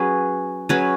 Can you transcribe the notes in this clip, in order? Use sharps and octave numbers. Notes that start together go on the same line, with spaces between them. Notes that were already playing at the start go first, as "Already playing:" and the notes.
Already playing: F#3 C#4 G#4 B4
F#3 C#4 G#4 B4